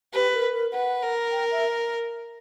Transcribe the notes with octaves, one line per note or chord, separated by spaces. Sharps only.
G4 B4
A#4
A#4
B4 F#5
A#4
G5
E5